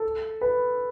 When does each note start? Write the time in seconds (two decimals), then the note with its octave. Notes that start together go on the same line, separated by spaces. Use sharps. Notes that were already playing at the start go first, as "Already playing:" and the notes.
Already playing: A4
0.41 B4